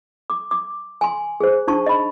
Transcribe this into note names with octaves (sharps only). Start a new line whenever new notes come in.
D6
D6
G#5 C6
G#4 C5
D4 D#4 A5 C#6
D#5 B5